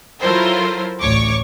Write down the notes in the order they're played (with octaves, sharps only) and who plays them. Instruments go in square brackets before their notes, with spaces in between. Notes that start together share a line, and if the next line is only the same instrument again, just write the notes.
[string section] F#3 E4 F4 A4 A#4 C5
A1 D2 C#5 C#6 D6